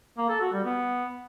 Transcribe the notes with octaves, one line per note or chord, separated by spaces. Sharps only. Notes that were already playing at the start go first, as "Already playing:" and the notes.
A#3
A4
F#4
G3
B3